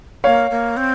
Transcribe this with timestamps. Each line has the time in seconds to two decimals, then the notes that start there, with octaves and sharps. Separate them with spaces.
0.24 A#3 C#5 F5
0.51 A#3
0.77 C4